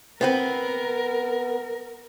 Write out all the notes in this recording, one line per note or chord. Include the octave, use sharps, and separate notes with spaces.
B3 C4 A#4 B4